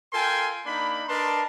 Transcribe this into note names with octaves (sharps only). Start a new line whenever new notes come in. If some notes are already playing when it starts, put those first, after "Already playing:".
F4 A4 A#4 G5 G#5 C6
A#3 D4 D#4 B5
D4 A#4 B4 D#5 A5 C6